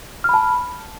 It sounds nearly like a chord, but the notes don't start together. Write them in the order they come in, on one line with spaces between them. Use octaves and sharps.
F6 B5 A5